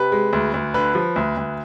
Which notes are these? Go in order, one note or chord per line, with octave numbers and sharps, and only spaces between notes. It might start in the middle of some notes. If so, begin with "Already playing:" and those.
Already playing: C3 B4
G#3
D2
D2
D3 B4
F3
D2
D2